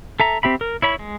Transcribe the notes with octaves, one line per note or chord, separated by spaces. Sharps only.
A4 E5 A#5
C4 G4 E5 B5
A#4
E4 C#5 B5
G#3